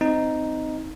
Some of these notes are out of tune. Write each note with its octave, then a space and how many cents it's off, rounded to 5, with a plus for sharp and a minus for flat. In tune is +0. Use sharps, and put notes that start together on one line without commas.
C4 -15 D#4 +0